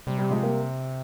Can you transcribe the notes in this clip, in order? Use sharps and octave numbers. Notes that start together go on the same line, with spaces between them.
C3 G3
G3
F3 G#3
G3 A#3